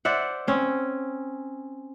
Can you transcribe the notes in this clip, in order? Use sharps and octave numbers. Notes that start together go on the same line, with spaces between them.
C5 D5 E5 F#5
C4 C#4